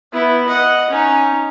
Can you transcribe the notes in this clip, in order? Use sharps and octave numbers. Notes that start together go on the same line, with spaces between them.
B3 E4
D#5 F#5
C#4 D#4